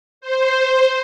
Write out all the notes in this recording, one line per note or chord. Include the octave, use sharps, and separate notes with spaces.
C5